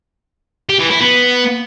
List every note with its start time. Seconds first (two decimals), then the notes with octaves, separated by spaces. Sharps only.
0.69 G4
0.80 E3
0.91 E4
1.01 B3